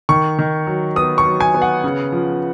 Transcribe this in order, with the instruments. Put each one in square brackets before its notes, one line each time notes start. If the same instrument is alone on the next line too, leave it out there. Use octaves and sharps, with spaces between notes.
[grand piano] D#3 C#6
D#3
F#3
B3 D#6
C#6
F#3
G#5
B3
F#5
C#3
F3